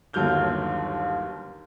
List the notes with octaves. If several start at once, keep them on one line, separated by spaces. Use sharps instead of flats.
G1 D#2 F#3 F6 G6 G7